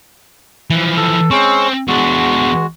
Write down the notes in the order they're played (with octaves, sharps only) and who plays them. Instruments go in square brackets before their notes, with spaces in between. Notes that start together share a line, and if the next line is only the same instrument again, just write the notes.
[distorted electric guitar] E3 F3
[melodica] A4
[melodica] G#3 C#4 C#6 [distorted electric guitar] C4
[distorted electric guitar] E2 D4 [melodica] G#3 F#4